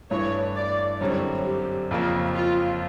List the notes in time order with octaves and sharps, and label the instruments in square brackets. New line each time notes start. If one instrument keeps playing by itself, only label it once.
[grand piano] G2 E3 A3 [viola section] C#5
[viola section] D5
[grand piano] F#2 D3 G3 C4 [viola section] C#5
[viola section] G4
[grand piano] F2 C#3 F3 A#3
[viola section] F4